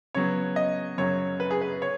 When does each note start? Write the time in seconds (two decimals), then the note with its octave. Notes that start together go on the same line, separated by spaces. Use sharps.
0.15 C#3 F#3 B3 C#5
0.56 D#5
0.98 F#2 C#3 F#3 C#5
1.40 B4
1.51 G#4
1.61 B4
1.82 C#5